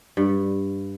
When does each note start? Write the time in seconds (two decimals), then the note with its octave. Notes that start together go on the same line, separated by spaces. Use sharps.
0.17 G2